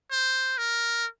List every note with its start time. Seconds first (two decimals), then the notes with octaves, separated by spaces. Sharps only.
0.11 C5
0.58 A#4